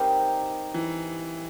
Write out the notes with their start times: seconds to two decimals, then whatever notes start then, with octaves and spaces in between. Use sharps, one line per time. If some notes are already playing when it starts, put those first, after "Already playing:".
Already playing: G3 C4 D#4 G4 A#4
0.74 E3